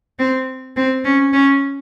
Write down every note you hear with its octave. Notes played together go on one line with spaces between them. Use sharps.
C4
C4
C#4
C#4